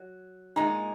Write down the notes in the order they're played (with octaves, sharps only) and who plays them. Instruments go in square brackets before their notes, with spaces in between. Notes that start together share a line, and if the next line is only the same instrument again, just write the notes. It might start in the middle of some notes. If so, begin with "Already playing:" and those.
Already playing: [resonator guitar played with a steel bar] F#3
[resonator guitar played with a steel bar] A#2 G#3 D#4 [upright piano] A#5